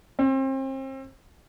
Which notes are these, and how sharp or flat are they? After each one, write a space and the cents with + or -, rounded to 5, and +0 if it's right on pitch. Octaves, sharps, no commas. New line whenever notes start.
C4 +35